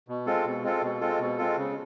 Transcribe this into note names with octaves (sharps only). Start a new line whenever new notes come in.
B2
G#3 C4 F4 A4
B2
G#3 C4 F4 A4
B2
G#3 C4 F4 A4
B2
G#3 C4 F4 A4
C#3